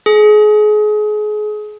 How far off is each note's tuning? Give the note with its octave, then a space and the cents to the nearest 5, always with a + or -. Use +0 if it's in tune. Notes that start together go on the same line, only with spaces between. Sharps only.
G#4 +30